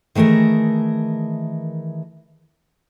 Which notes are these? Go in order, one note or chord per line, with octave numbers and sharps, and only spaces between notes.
D#3 E3 A3 G#4 A#4